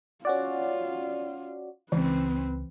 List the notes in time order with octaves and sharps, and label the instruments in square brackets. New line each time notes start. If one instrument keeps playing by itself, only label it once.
[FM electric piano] C#4 F#4 D5 [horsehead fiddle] F4
[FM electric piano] C#2 [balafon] E3 [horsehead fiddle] C4 B4